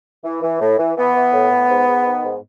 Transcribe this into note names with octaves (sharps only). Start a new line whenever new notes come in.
E3
E3
A2
E3
E3 B3
E3
A2
A2
G#2
G#2
D#3
G#2